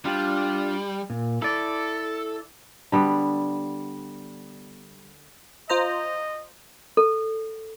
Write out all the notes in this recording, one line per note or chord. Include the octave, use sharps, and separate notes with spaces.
G3 D4 F4
A#2
E4 A4 D5
D3 G3 B3
F4 C5 D#5 A#5
A4